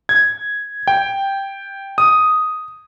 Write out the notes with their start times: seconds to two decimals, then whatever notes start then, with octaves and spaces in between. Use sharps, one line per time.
0.09 G#6
0.88 G5
1.98 D#6